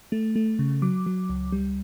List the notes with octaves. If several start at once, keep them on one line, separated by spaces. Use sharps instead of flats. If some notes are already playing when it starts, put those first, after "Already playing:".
A3
A3
C#3
F#3 D6
F#3
C#2
G3